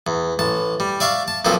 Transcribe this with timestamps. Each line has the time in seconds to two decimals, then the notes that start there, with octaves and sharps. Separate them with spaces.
0.07 E2
0.39 A1 A5
0.80 G3
1.00 D5 E5 F5 C#6
1.28 A5
1.45 B1 A#2 F3 C4 A4